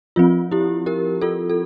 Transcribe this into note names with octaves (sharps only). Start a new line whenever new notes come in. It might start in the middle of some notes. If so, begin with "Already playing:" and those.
F3 C4 F4
E4 G4
G4 A#4
F4 A4
A4